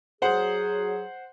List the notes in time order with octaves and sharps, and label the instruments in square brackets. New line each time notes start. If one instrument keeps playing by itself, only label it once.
[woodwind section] F#3 G#4 [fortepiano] C5 F#5